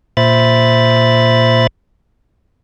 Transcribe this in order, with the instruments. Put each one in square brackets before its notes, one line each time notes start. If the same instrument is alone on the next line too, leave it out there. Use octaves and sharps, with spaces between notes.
[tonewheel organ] A#2 C5 E5 B5 A6